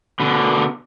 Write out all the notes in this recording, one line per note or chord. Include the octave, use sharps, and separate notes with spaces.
B2 D3